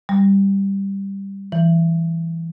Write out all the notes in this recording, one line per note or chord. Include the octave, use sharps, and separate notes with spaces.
G3
E3